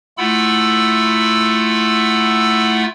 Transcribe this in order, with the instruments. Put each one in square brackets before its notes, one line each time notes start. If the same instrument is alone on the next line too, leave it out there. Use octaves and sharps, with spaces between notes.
[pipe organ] A3 E4 F4 F#5 B5 E6